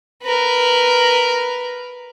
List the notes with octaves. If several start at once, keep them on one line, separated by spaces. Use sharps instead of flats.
A#4 B4